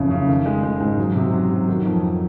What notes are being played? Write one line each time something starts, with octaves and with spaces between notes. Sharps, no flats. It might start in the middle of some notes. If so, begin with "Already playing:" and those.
Already playing: F#1 F2 C#3
C#3
D#3
G#3
G#3
G#2
F#3
C3
F#3
F#3
D#3
F2
D#3